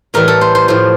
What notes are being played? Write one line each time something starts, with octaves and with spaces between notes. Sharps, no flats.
A2 E3 G3 A#4
A4
C5
C5
A2 F3 C5